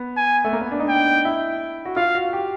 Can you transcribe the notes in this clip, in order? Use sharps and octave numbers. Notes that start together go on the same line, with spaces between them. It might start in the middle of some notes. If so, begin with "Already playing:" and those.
Already playing: B3
G#5
A3
A#3
B3
D4
D#4
G5
E4
F#4
F4 F5
F#4
G4